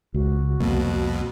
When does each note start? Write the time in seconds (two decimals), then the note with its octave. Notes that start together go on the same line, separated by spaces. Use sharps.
0.14 C#2 F#4
0.60 C2 F2 B2 A#3